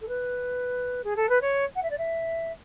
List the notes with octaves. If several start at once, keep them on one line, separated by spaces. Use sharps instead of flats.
A4
B4
G#4
A4
B4
C#5
F#5
E5
D5
E5